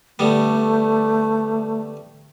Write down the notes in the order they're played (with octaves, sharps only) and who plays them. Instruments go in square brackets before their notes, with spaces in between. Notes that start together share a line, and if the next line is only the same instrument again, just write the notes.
[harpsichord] D3 G3 B3 [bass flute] A3